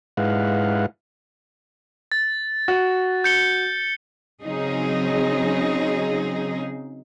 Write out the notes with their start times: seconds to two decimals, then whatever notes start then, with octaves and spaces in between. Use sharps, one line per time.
0.17 G#2 G#3 E4 B4 F5 F#5
2.12 A6
2.68 F#4
3.24 G6 C#7 G7
4.42 C#3 F#3 C4 D#4 G#4